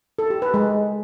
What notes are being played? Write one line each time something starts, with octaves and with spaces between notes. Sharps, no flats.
A4
G4
B4
G#3